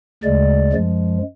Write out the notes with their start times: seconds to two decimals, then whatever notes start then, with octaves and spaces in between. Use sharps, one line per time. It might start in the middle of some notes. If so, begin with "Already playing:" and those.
0.23 D2 C#3 G#3 D5
0.72 F#2 F3 G#3